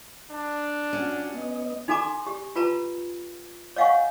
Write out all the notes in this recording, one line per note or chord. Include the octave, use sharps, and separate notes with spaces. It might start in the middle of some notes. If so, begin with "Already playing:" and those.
D4
C#4 F#4
B3 D#5
D#4 F#4 A4 G#5 A#5 D6
G4
F4 B4 A5 A#5
C#5 D#5 F5 F#5 G#5 C#6